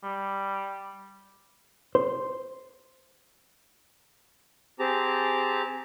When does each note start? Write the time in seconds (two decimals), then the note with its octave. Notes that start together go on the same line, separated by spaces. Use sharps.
0.04 G3
1.95 C5
4.79 C4 G4 G#4 A5 A#5